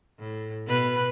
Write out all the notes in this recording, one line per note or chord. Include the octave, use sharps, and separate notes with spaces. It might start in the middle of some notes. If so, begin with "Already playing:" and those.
A2
B2 B4